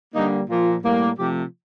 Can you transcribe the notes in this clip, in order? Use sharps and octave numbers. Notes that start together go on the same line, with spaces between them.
D3 G3 A#3 D#4
A#2 F3 A#3 F4
A2 G3 A#3
C3 F3 A3 G4